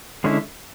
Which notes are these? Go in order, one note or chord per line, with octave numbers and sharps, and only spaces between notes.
D3 G#3 C#4 E4